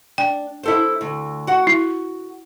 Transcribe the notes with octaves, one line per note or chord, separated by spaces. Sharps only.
D4 G5
E4 A4 C5
D2
F#4 F#5
E4